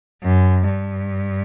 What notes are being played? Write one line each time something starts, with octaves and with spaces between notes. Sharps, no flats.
F#2
G2